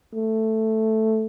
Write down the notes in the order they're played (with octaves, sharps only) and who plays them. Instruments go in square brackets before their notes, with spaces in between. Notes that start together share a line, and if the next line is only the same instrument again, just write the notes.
[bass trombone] A3